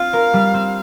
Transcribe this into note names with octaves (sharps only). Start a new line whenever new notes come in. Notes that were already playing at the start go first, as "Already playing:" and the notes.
Already playing: C4 F4 F5
A#4
G3
C4